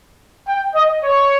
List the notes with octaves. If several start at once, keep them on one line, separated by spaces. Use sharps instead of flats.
G5
D#5
C#5